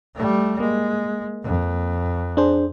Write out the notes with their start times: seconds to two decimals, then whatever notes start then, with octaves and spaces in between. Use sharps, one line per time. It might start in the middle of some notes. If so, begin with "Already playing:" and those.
0.15 G3 A3
0.60 G#3 A#3
1.44 F2
2.37 D4 G#4 C5